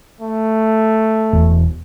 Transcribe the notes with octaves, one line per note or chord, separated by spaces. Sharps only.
A3
E1